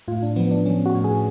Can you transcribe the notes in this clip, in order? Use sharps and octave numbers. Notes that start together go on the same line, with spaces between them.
A2 F4
D4
F3 B3
D4
F3 C#4
F#4
A2
G#4